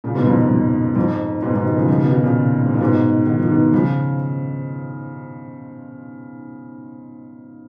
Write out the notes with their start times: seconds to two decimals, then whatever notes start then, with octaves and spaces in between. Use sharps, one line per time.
0.04 A#2 C#3
0.15 G#2 B2
0.26 F2 G#2
0.49 F2
0.96 F2 G#2
1.42 G#2 B2
1.54 G#2 B2
1.65 B2 D#3
1.76 C#3 F3
1.88 C#3 F3
1.99 B2 D#3
2.11 B2 D#3
2.23 A#2 C#3
2.66 G#2
2.74 A#2
2.80 G#2 B2
3.27 D#3
3.39 F3
3.51 B2 D#3
3.73 C#3 F3